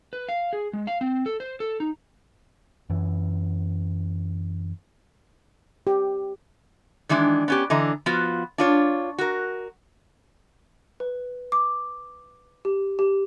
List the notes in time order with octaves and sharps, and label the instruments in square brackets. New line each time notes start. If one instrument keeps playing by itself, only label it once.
[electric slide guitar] B4
F5
G#4
G#3
F5
C4
A4
C5
A4
D#4
[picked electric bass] F#2 E3
[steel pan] G4
[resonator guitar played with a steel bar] D#3 E3 G#3 D4
B3 C#4 G4
D3 E3 D#5 A#5
F3 B3 F4 F#4
D4 F4 C#5
F#4 A#4
[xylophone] B4
D6
G4
G4